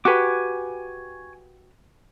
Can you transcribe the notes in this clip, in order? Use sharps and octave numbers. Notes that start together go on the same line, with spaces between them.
F#4 G4 B4 G#5 C#6 D6